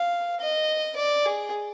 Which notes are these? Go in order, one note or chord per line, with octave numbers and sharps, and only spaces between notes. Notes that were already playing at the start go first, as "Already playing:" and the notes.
Already playing: F5
D#5
D5
G#4